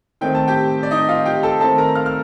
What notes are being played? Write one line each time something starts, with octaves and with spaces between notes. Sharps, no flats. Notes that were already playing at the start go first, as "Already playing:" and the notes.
D#3 A3 C4 G5
A5
G4 G5
D5
D#4 D#5
F4 F5
G4 G5
A4 A5
D#3 A3 C4 A4 A5
A#4 A#5
F5 F6
F6